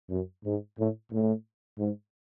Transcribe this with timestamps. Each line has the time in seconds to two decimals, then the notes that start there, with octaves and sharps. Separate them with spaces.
0.10 F#2
0.44 G#2
0.78 A2
1.12 A2
1.79 G#2